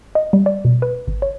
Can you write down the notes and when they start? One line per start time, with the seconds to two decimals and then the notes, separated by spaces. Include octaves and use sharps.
0.15 D#5
0.33 G3
0.46 D5
0.65 B2
0.82 B4
1.07 G#1
1.22 C#5